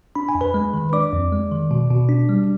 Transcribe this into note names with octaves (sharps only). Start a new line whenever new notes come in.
D4 B5
G#5
F2
B4 B5
G#3
D#3
D4 D5 D6
F2
G#3
D#3
B2
B2
D4
G3